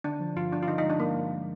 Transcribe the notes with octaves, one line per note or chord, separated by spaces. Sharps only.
D3 D4
F3
G2 F4
G2 D4
F4
D3 D#4
D#4
G#3
D4
G2 A#3
G2